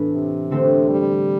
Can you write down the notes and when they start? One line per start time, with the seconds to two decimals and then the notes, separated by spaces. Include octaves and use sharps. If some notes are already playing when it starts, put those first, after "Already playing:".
Already playing: A2 E3 B3 D4 A4
0.13 C3
0.51 D3 A3 C4 G4
0.89 G3